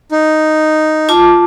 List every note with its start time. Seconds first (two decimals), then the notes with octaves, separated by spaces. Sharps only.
0.11 D#4
1.09 F4 A5 D6